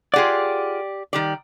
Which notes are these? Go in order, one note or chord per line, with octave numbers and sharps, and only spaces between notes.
F4 G4 G#4 D5 F#5
D#3 G3 D5